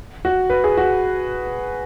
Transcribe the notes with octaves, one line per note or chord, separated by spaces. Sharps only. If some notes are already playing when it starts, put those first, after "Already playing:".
F#4
B4
G#4
F#4